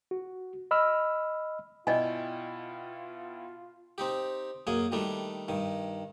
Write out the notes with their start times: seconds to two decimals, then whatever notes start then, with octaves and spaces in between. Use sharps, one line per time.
0.11 F#4
0.71 D#5 B5 E6 F6
1.87 B2 E4 F4 D5 D#5 G5 G#5
3.98 C4 D#4 G4
4.67 F#2 A#3 G#4 G#5
4.92 D#3 G3 A3 D4
5.48 G2 D#3